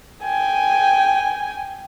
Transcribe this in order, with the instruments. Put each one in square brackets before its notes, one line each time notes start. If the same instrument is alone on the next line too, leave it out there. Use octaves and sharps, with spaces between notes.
[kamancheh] G5 G#5